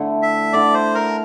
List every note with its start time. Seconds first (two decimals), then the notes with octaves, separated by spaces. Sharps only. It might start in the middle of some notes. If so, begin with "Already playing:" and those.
Already playing: D3 A3 E4
0.22 E5
0.53 D3 A3 E4 D5
0.74 C5
0.95 A#4